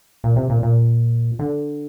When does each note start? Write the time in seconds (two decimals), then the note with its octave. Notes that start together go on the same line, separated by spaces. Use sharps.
0.24 A#2
0.36 C3
0.50 A#2
0.63 A#2
1.39 D3